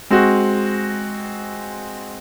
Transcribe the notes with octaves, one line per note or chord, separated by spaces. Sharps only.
G#3 C4 F#4